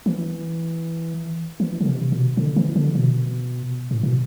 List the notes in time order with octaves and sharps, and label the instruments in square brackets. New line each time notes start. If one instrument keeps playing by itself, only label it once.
[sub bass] E3
E3
D3
C3
B2
D3
E3
D3
B2
A2
B2